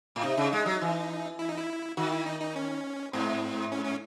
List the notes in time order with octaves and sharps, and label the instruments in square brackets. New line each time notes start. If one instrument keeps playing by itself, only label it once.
[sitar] A2
[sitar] C3 [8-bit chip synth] D#4
[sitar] C#3
G#3
F#3
E3
[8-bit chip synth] E4
D#4
E4
[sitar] D#3 [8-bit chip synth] F#4
[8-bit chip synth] E4
D#4
D#4
C#4
[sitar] G#2 [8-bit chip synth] C4
[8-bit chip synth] C#4
C#4